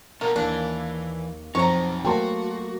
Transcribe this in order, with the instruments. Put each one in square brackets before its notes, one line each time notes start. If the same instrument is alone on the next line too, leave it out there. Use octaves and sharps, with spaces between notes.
[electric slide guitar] B2 B3 A4 [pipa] A#3
[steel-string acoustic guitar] D#2 A#3 [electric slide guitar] E3 [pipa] D4
[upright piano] F2 [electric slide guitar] F#3 D#4 [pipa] C#5 A#5
[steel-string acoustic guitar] F#3 A3 A#3 [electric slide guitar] F#4 [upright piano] G5 A5 C6